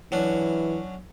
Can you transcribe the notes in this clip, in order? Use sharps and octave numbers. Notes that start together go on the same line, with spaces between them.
E3 F#3 C#4 D4